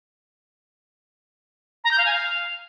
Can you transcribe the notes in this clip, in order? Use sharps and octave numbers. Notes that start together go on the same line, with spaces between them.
A#5
G6
F5
G#5
F5